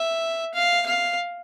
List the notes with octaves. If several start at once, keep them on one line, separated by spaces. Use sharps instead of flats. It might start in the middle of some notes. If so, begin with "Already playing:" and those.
Already playing: E5
F5
F5